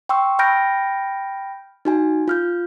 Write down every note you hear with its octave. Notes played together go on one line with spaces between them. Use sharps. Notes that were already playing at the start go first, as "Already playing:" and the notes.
G5 C6 C#6 E6
G5 B5 F6 G6 A#6 D7
D#4 F#4 G#5
F4 F6 G6